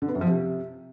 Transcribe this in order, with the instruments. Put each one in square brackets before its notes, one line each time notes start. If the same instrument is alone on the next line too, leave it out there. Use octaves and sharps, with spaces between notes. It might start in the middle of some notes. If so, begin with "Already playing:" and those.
[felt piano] D3
B3
F#2
F3
C3